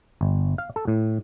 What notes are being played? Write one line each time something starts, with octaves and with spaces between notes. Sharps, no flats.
G1
F5
A4
A2